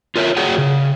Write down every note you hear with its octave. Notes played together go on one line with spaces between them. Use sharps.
F4 A#4 C#5 E5
F#4 G#4 C#5 F#5 G5
C#3